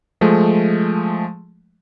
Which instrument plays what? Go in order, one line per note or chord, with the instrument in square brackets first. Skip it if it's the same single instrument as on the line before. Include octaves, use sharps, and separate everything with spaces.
[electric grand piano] F3 G#3 A3